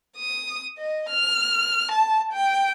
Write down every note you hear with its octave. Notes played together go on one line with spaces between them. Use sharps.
D#6
D#5
F6
A5
G5